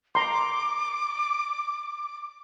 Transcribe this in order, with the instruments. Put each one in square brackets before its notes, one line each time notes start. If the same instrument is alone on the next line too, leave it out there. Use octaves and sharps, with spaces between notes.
[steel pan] A#5 C6 [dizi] D6